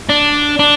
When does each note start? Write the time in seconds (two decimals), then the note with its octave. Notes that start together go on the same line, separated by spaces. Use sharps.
0.09 D4
0.59 D4